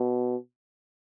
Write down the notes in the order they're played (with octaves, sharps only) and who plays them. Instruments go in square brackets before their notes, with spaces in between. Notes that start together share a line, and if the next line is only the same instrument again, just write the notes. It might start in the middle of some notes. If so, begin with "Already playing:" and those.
Already playing: [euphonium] B2